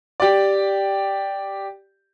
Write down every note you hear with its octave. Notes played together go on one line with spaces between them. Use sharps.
G4 D5